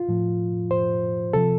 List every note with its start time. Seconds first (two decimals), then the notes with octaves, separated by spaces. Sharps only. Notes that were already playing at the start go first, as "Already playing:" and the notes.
Already playing: F4
0.09 A2 F3
0.71 C5
1.33 C3 F3 A4